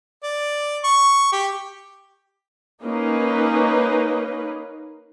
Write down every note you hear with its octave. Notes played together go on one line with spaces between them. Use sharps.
D5
C#6
G4
A#3 C#4 D#4 B4